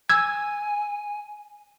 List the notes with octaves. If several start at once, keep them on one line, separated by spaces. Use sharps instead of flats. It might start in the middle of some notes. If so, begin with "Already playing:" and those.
G#5 E6 G#6